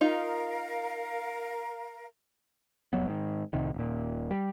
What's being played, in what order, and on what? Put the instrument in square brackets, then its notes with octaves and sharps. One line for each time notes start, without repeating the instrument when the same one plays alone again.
[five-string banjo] D#4 F4 [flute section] A#4 F5
[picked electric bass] F1 C2 F#3 B3
G#2 D#3
C2 A2 C3 D#3
D#1 A#2
G3